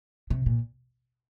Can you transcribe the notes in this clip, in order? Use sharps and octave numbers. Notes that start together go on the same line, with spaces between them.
C3
A#2